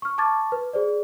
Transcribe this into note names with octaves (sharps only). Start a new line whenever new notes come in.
C#6 F6
A5 C#6 D6 G#6 A6
B4
G#4 C5 D5